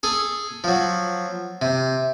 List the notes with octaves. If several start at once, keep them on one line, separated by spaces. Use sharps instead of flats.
G#4 A4
F3 F#3
C3